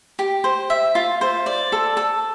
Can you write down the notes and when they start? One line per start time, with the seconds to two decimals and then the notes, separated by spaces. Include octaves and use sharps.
0.19 G4
0.44 C5
0.70 E5
0.95 F4
1.21 C5
1.46 D5
1.72 A4
1.97 A4